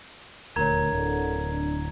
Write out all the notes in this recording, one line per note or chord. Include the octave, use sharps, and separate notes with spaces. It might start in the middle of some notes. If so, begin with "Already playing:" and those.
D#1 D2 A#4 C#5 A#5 G#6
D1 D3
D4